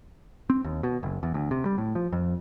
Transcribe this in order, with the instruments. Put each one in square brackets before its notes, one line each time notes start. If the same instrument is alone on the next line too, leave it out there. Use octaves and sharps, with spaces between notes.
[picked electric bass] C4
D#2
B2
F#1
E2
D2
C3
G3
A2
F3
F2